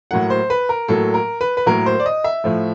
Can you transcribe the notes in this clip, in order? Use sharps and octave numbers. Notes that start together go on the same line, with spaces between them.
A2 F#3 A#3 F#5
C5
B4
A#4
A2 F#3 A#3 A4
A#4
B4
B4
A2 F#3 A#3 A#4
C5
D5
D#5
E5
A2 F3 A3